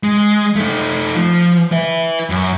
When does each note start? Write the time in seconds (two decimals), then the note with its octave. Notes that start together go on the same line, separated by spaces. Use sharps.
0.03 G#3
0.56 A3 D#4
1.15 F3
1.72 B4 E5
2.30 F#2